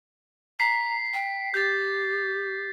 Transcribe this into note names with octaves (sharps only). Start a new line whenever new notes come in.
A#5 B6 C7
G5
G4 G6 A6